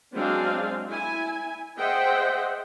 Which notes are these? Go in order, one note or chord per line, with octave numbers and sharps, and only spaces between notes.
F#3 G#3 C4 D4 F5 G#5
E4 G#5
G#4 C5 D#5 E5 F#5 G5